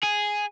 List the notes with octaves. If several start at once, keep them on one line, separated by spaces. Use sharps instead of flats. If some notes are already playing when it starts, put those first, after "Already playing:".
G#4